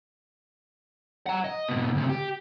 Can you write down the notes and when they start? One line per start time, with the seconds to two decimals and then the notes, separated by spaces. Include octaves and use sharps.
1.26 F#5 A#5
1.44 D#5
1.69 G#2 B2
1.95 D2 C3
2.09 G4